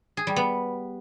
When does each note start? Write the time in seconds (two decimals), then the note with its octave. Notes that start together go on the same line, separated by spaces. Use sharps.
0.17 G#4
0.27 G3
0.36 B3